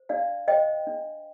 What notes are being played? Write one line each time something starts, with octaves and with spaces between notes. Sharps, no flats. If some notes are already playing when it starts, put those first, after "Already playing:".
Already playing: C5
D4 D5 F5
C5 D#5 G5
D4